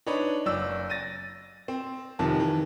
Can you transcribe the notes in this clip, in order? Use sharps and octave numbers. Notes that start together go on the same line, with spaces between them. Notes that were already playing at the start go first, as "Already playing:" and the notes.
D4 D#4 B4 C#5
F#1 D5 E6
A6 A#6 D#7
C4
F1 C3 D#3 F3 A5
D#3 E3